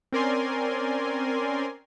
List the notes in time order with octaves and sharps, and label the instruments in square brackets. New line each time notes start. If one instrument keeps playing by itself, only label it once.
[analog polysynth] C4 C#4 A#4 D5 G#5 C6